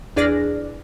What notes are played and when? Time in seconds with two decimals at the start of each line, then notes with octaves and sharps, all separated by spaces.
0.16 E2 D4 G#4 D5 F6 A#6